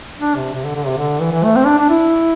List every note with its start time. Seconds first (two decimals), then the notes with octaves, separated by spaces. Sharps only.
0.19 D4
0.36 C3
0.53 C3
0.64 D3
0.75 D3
0.86 C3
0.97 D3
1.21 E3
1.32 E3
1.44 A3
1.56 C4
1.66 D4
1.78 D4
1.90 E4